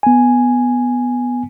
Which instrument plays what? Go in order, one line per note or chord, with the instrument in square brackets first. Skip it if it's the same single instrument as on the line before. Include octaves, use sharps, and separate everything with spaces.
[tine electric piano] B3 G#5